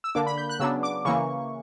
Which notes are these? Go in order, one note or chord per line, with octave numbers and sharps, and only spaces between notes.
E6
D3 A#3 D4 D6
B5
G6
F#6
C#3 F#3 B3 D4 E6
D6
C#3 E3 A#3 C#6